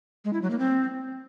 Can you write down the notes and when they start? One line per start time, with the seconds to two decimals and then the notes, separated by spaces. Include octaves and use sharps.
0.25 G#3
0.33 E4
0.42 F#3
0.50 A#3
0.59 C4